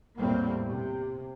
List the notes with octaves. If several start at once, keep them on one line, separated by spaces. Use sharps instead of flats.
E2 A2 G3 A#3 C4
C3